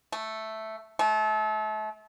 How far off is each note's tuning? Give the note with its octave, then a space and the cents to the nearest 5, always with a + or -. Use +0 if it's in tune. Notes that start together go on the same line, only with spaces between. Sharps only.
A3 +0
A3 -35